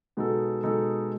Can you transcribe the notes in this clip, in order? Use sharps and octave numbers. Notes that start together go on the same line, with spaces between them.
B2 G#3 D#4 A4
B2 G#3 D#4 A4